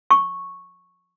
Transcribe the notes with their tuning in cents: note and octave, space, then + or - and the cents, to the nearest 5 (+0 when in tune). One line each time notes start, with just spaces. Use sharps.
C#6 -5